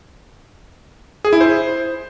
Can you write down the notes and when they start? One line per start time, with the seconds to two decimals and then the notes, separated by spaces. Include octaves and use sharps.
1.25 G#4
1.33 E4
1.41 C5